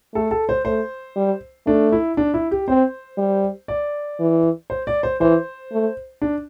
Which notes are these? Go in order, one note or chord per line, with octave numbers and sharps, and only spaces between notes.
A3 A4
A4
C5
A3 C5
G3
A3 D4
E4
D4
E4
G4
C4 C5
G3
D5
E3
C5
D5
C5
E3 C5
A3
D4